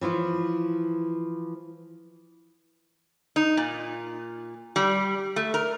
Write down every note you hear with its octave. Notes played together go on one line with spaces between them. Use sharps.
E3 F3 E4 F4
D#4
A#2
G3
A3
A#4